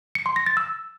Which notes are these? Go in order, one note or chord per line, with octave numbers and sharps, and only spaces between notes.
C#7
C6
A#6
A6
E6